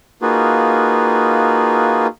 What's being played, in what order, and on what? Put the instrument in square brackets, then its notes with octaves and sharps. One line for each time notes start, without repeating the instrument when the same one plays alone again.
[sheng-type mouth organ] A#3 D#4 F4 F#4 G#4 B4